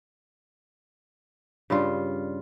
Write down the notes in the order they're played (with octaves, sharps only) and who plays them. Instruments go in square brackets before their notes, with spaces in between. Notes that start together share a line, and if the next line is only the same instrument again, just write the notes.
[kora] G2 C#3 G3 F4